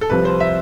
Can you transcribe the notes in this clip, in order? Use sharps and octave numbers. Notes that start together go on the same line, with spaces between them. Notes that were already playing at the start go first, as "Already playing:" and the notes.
A4
C2 C3 F3 B4
C5
E5